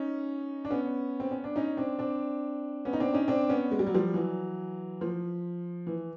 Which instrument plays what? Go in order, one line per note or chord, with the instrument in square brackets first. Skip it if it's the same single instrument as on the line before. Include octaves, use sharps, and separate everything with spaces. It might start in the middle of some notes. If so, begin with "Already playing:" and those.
Already playing: [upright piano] C#4 D#4
D4
B3 C#4
C4
C#4
D4
C#4 D#4
C4 D4
C4 D4
B3 C#4
D#4
C4 D4
C#4 D#4
C4 D4
B3 C#4
G#3
G3
F#3
F3 G3
E3 F#3
F3
E3